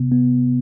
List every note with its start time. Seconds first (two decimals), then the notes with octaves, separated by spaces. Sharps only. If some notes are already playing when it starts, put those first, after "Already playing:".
Already playing: C3 B3
0.12 B3